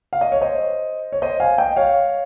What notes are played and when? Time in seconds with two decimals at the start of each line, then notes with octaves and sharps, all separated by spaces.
0.13 F5
0.21 D#5
0.32 C#5
0.41 C5 D#5
1.12 C#5
1.22 C5 D#5
1.40 F5 G#5
1.58 D#5 G5
1.76 C#5 F5